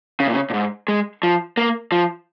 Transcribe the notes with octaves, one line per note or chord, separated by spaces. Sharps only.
C#3
A#2
C#3
A#2
G#2
G#3
F3
A#3
F3